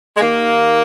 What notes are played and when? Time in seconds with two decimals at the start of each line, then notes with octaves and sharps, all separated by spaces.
0.17 G#3
0.21 D#2 D#3 A#3